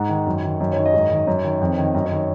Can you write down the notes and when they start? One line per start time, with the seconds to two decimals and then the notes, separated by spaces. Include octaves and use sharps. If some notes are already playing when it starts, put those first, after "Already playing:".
Already playing: G#2 F#5
0.09 D#3
0.27 F#2
0.44 D#3
0.60 F#2 D#5
0.73 D#3 C#5
0.85 D#5
0.94 G#2
1.11 D#3
1.27 F#2
1.44 D#3
1.61 F2
1.78 D#3
1.94 F#2 D#5
2.06 C#5
2.11 D#3